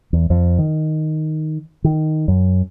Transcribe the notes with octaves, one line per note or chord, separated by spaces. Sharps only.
E2
F2
D#3
D#3
F#2